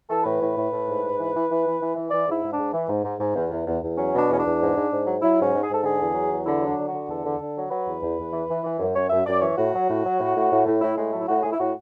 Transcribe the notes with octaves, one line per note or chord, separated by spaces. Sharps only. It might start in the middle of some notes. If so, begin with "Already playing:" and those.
E3 A4
A2 B4
A2
A2
A2
G#2
G#2
E3
E3
E3
E3
E3
E3
E3 D5
G#2
E4
G#2
G#2 D4
E3
G#2
G#2
G#2
E2
E2
E2
E2
F#3 C#4
B2
D4
E2 C#4
E2 D4
G#2
G#2
G#2
F#3
F#3 E4
G#2 C#4
G#2
G#4
G#2
A4
D3 G#4
E2
F#3
E2
D3 E4
F#3
D4
D3
D3 F#4
E2 A4
D3
D3
F#3
F#3 B4
E2
E2
E2
E3
E3
E3
F#2
F#2 C#5
F#2 E5
F#2 D5
E3 C#5
A2 F#4
F#3
A2
F#3
A2
A2
A2
A2
A2 E4
A2 G#3
F#3 A3
E4
A2 F#4
A2 G#4
E4
A2 F#4